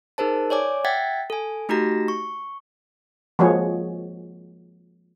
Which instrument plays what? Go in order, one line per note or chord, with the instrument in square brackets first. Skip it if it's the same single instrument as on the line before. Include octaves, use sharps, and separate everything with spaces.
[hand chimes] D#4 G#4 A#4 C5 A5
C#5 D5 G#5 D6
E5 F#5 G5 G#6 A6 B6
A4 G#5
A3 D#4 F#4 G4 A#5 A#6
C#6
[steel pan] F3 G#3 A#3 F#4 G#4 C#5